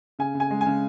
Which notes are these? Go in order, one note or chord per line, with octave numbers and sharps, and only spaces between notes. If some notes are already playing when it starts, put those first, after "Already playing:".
C#3 G#5
C#3
G#5
G#3
G#5
C#3